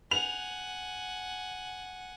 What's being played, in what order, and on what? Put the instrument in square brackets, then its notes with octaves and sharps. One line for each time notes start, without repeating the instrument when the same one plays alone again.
[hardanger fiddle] F#5 G#5 [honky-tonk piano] F7